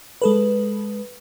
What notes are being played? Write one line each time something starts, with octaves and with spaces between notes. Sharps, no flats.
G#3 A4 B4